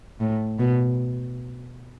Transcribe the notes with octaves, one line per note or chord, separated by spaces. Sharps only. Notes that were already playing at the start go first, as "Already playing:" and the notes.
A2
B2